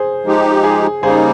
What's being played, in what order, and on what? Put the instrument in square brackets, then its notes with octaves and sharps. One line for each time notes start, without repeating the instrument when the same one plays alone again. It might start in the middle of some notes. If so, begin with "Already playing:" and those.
Already playing: [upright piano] G#4 C5
[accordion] F3 G#3 D#4 G4
[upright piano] G#4
[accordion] C#3 G3 A#3 D#4 [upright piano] G#4 C5